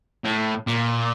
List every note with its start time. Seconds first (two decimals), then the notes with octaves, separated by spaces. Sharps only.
0.24 A2
0.67 A#2